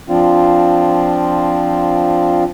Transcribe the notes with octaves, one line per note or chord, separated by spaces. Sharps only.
F3 C4 D4 F4